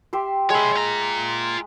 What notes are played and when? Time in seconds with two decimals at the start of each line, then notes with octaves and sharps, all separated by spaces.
0.13 G4 E5 C6
0.50 G#3 C#5 E5 B5
0.76 F4 A#5